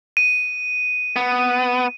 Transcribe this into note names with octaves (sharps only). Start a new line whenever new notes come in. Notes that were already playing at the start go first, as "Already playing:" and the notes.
D#7
B3